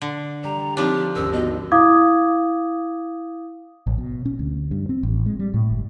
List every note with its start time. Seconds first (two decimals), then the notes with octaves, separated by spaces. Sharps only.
0.02 D3
0.44 G3 A#5
0.77 F3 C4 D4 D#4 G4 C#5
1.15 G#1 D#2 C#4 A#4 E6
1.33 B3 F#4 D#5
1.72 E4 F5 D6 D#6 G#6
3.87 A1
3.98 B2
4.25 C#4
4.39 D2
4.71 G2
4.89 C4
5.03 A1
5.26 G#3
5.39 G3
5.54 A2
5.71 G1